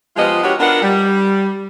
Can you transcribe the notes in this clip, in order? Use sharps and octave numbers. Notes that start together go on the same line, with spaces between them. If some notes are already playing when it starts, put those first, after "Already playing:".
F3 G#3 B3 F4 G4 D#5
B3 D4 F#4 G4 A#4 C#5
B3 D4 F4 A#4 D#5 F#5
G3